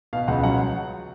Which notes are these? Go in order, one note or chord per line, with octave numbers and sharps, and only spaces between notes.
B2 F5
C#2 F#5
F#3 F#5